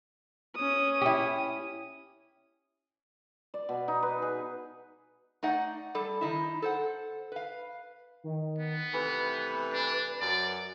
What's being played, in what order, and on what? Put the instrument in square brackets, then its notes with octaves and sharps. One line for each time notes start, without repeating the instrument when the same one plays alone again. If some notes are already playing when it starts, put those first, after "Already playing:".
[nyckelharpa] C#4 D#6
[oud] E4 G4
[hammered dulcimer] D5
B2
D#4
B4
G#4
[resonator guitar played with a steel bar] A3 D#4 D5 F#5
G3 A4
D#3 D#4 E4
A4 C5 F#5
B4 F5
[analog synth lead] D#3
[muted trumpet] B3
[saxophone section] C3 E3 A3 [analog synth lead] B4
[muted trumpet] D4
[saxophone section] F#2 [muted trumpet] D5